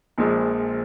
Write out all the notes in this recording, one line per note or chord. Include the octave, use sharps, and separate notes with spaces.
A#1 A#2 F3 G#3